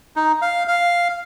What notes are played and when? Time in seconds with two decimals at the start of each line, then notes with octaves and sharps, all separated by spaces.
0.16 D#4
0.42 F5
0.68 F5